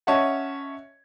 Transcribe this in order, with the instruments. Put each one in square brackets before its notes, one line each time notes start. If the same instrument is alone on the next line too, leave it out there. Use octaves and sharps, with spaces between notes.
[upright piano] C#4 C#5 D#5 E5 F#5 A5